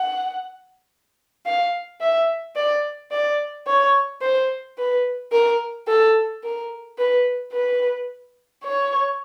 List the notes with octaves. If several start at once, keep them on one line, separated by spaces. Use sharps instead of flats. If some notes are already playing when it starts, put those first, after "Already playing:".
Already playing: F#5
F5
E5
D5
D5
C#5
C5
B4
A#4
A4
A#4
B4
B4
C#5